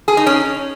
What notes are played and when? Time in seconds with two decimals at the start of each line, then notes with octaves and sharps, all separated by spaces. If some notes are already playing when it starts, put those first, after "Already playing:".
0.08 G#4
0.17 D#4
0.27 C#4